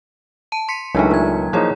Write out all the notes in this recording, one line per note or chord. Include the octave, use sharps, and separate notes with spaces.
A5 D#7
C6 B6 C#7
C#2 D#3 E3 F#3 A3 D4 D#4 G#4
A#2 F#3 G#6
F3 A#3 D#4 E4 G#4 C#5